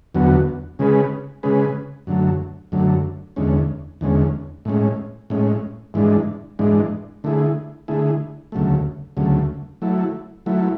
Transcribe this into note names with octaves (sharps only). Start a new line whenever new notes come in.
E2 D3 F#3 B3 F#4
C#3 G#3 C#4 G#4 B4
C#3 G#3 C#4 G#4 B4
F#2 D3 F#3 A3
F#2 D3 F#3 A3
E2 D3 G#3 C#4
E2 D3 G#3 C#4
A2 G#3 C#4
A2 G#3 C#4
G#2 E3 G#3 D4
G#2 E3 G#3 D4
D3 A3 E4 G#4
D3 A3 E4 G#4
D2 C#3 F#3 A3
D2 C#3 F#3 A3
F#3 A3 E4
F#3 A3 E4